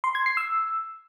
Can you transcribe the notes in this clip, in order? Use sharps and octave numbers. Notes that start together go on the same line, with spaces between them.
C6
G#6
C7
E6